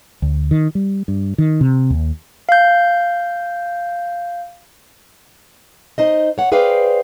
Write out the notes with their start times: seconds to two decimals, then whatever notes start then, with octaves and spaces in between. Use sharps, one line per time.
0.22 D2
0.51 D#3
0.75 G3
1.08 G2
1.38 D#3
1.61 C3
1.90 D#2
2.49 F5 G6
5.98 D#4 C5 D#5
6.38 C#5 F#5
6.52 G#4 B4 C5 D5 F5 G5